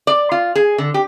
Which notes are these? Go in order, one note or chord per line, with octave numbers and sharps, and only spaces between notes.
D5
F4
G#4
D3
G4